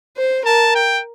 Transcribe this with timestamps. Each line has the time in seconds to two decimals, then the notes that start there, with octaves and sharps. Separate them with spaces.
0.17 C5
0.46 A#4 A5
0.75 G5